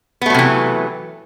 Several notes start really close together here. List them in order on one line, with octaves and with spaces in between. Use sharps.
B3 A3 F#3 C3 E3